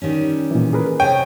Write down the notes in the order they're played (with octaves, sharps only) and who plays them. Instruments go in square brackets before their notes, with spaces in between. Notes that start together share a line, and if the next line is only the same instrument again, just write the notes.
[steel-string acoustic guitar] D#3 G3 C#4
[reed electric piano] A#2 E3
G#4 A#4 B4
[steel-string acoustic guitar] C3 D#5 G#5 [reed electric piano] C#5 [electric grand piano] G5